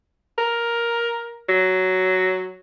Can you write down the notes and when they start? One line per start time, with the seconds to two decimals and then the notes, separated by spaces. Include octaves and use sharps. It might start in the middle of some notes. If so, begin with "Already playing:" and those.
0.38 A#4
1.49 F#3